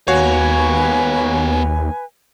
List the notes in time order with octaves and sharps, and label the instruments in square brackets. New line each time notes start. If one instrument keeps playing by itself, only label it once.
[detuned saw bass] D#2 [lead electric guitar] B3 F5 [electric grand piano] F#4 C#5 [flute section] B4 G#5